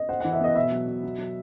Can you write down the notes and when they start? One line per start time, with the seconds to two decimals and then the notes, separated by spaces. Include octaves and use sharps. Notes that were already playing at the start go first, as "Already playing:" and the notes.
Already playing: D#5
0.09 C5 F#5
0.20 E3 F#5
0.33 E5
0.41 B3 D#5
0.56 B2 E5
0.72 F#3
0.88 B2
1.03 F#3
1.18 F#3